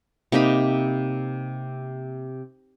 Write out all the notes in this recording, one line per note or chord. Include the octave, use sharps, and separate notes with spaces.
C3 A#3 D#4 B5